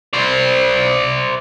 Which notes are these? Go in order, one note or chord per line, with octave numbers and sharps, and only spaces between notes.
C5 D5